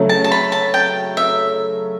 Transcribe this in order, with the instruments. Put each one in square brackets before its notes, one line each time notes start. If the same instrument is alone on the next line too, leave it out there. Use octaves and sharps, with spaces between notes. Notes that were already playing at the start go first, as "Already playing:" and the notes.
Already playing: [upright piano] C#3 F#3 A3
[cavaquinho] A5
A5
B5
A5
G5
E5